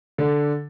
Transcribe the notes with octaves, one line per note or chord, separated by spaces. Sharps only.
D3